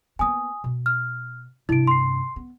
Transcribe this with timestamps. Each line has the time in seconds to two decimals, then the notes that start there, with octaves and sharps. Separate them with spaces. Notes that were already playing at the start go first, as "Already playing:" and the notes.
0.19 A#3 B3 G#5 D#6
0.64 B2
0.86 F6
1.69 G2 C3 E4 D7
1.87 C6 C7
2.36 B3